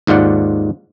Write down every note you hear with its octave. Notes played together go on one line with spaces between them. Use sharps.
D#2 G#2 F4 D5 F#5